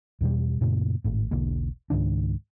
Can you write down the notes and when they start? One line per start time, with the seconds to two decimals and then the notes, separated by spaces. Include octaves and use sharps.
0.21 E2 B2 G3
0.61 F#2 A#2 C#3 A3
1.04 G#1 A2
1.31 E1 B1 D3 A#3
1.90 C#2 G#2 D#3 D4